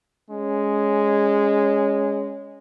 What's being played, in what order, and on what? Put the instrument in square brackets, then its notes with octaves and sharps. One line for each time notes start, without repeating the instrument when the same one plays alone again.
[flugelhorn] G#3 [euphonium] C#4